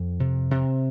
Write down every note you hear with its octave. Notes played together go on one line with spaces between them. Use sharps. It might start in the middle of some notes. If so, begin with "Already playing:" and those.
Already playing: F2
C3
C3